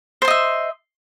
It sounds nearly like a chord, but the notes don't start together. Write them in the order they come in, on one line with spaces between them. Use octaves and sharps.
C5 C6 D#5 E5